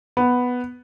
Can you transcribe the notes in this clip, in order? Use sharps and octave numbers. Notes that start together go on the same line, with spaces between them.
B3